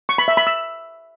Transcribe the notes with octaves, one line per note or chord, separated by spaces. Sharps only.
C#6
B5
E5
B5
E6